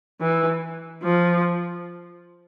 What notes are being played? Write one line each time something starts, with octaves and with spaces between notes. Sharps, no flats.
E3
F3